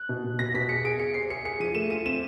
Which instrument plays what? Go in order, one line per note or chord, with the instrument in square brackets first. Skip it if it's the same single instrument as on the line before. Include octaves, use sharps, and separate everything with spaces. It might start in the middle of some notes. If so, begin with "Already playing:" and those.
Already playing: [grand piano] F#6
[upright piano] B2
B2
[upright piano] B2 [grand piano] A#6
[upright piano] B2 [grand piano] B6
[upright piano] G#4 [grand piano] C#7
[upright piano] G#4 [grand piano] D7
[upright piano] G#4 [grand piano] C#7
[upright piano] C5 [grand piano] C7
[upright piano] G#4 [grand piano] C#7
[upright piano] G#4 [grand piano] C#7
[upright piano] F3 [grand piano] D#7
[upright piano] A3 [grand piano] E7
[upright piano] F4 [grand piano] D#7
[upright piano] C4 [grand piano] E7